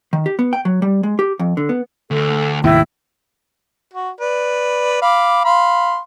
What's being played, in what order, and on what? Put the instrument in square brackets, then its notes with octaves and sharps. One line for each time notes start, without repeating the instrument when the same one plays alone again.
[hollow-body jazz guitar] D#3
G4
B3
G5
F#3
G3
G#3
G4
F2
D3
B3
[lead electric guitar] D2 [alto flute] A4
[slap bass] D#2 A2 C3 [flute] E4 [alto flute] G5
[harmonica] F#4
B4 D5
F5 B5 D6
F5 B5 C6